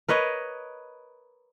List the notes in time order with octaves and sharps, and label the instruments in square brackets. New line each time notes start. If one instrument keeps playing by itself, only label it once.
[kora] A#4 B4 C#5 D#5